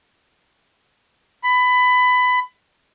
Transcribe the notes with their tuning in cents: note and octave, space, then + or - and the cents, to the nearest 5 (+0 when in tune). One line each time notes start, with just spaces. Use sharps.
B5 +20